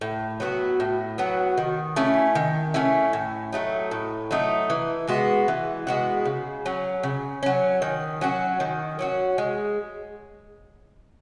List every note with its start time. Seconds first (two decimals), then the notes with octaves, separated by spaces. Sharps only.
0.01 A2
0.40 F#3 B3 F#4
0.80 A2
1.18 F#3 B3 F#4
1.58 D#3
1.96 A3 C#4 E4
2.35 D#3
2.74 A3 C#4 E4
3.13 A2
3.53 F#3 A3 D#4
3.91 A2
4.31 F#3 A3 D#4
4.70 E3
5.08 G#3 B3 F#4
5.48 E3
5.87 G#3 B3 F#4
6.25 C#3
6.66 F#3 C#4
7.03 C#3
7.43 F#3 C#4
7.82 D#3
8.21 F#3 C#4 F#4
8.60 D#3
8.99 F#3 C#4 F#4
9.38 G#3